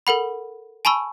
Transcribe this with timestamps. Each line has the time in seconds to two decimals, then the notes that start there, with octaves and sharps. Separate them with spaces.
0.07 A4 A#4 F#5 B5
0.85 G#5 A5 B5 C#6 E6